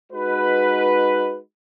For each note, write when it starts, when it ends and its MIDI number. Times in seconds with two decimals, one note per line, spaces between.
0.12 1.38 56
0.12 1.38 63
0.12 1.38 66
0.12 1.38 71